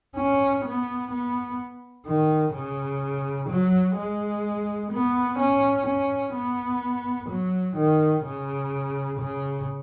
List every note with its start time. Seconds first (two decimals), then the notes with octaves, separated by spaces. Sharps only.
0.16 C#4
0.65 B3
1.12 B3
2.07 D#3
2.53 C#3
3.49 F#3
3.97 G#3
4.91 B3
5.39 C#4
5.87 C#4
6.34 B3
7.29 F#3
7.76 D#3
8.24 C#3
9.20 C#3